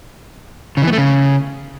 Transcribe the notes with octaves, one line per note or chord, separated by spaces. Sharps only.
C#3
E3
B3
A3
C#3